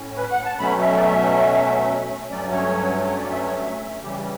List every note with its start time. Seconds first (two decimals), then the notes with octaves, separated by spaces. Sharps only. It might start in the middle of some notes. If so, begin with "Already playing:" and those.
Already playing: A2 C#4
0.16 B4
0.31 F#5
0.45 A5
0.59 B2 F#3 A3 C#4 B5
0.80 E5
0.95 D5
1.02 E5
2.31 G2 F#3 A3 C#4 D5
2.52 C#5
3.07 C#5
3.17 D5
3.31 E5
3.45 C#5
3.59 E5
4.02 C#3 E3 G3 C#4 G4